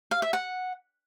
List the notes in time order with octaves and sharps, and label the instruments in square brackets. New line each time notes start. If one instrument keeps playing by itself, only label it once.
[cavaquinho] F5
E5
F#5